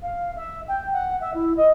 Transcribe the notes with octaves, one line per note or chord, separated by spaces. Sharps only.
F5
E5
G5
F#5
E5
E4
D#5